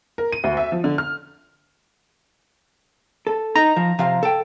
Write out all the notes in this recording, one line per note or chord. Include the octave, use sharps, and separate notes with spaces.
A#4
D#7
D2
E5
F3
D3
F6
A4
D#4 A#5
F3
C3 F3 F5
A4 G5